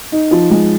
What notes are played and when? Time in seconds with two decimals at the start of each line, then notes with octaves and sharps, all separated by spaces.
0.12 D#4
0.31 F3
0.50 G#3